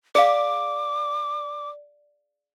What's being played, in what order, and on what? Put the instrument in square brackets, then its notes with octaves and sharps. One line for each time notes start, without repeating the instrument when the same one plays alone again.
[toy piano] G#4 F5 [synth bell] D5 [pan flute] D6